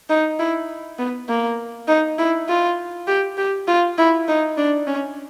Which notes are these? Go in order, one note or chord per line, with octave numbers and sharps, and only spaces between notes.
D#4
E4
B3
A#3
D#4
E4
F4
G4
G4
F4
E4
D#4
D4
C#4